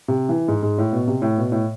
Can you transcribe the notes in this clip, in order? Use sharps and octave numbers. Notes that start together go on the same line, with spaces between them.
C3
E3
G#2
G#2
A2
B2
C3
A2
B2
A2